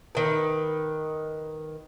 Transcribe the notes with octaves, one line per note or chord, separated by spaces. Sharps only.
D#3 B4